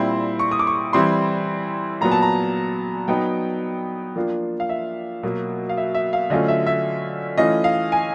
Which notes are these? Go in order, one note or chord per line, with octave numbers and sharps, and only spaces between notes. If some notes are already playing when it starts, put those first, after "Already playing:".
Already playing: A#2 G3 C4 E4 C6
C#6
D#6
D6
C#6
E3 G3 C4 E4 C6
A#2 F#3 B3 A#5
A5
A#5
F#3 B3 D#4 G5
F3 A#3 D4 F4
F5
E5
B2 F#3 A#3
F5
E5
E5
F5
D3 F#3 A3 C#4 F4 D#5
E5
E5
E3 A3 C#4 F4 D#5
F5
G#5